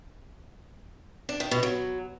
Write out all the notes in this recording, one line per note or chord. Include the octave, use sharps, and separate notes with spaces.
D4
D#3
B2
F#3